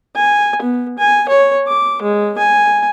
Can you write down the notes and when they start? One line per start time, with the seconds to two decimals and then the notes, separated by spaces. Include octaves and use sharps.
0.16 G#5
0.62 B3
0.98 G#5
1.29 C#5
1.67 D6
2.02 G#3
2.38 G#5